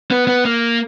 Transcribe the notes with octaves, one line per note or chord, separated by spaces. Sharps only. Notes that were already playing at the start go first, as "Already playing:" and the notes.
B3
B3
A#3